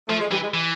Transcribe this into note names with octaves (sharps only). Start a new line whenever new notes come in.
F3 A3
G#3
E3 G3
G#3
E3